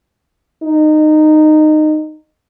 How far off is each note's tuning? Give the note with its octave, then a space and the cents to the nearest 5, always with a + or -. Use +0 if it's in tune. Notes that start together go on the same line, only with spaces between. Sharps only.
D#4 -20